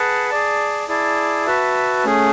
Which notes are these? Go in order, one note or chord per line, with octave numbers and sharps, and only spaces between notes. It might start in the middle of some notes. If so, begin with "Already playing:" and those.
Already playing: G#4 B4 F#5 A5
G#4 D5 A5
E4 G#4 D5 A5
F#4 B4 E5 A5
A3 C#4 G#4